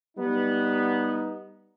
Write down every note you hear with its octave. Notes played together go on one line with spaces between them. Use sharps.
G3 B3 D#4